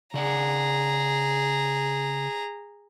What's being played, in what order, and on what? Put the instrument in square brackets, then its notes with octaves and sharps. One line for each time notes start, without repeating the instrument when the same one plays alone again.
[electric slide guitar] C#3 D5 F#5 [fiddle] G#4 A#5